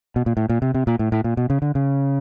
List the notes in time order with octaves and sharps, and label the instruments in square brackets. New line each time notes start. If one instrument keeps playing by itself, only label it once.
[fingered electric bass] B2
A#2
A2
A#2
C3
C3
A#2
A2
A2
A#2
B2
C#3
D3
C#3